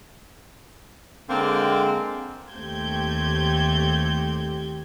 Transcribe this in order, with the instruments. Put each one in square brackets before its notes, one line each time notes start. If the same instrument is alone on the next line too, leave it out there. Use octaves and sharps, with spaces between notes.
[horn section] D3 G#3 A#3 C4
[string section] D#2 A3 C4 G4 G6 G#6